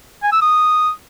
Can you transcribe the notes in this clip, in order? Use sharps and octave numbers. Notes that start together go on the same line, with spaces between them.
G#5
E6
D#6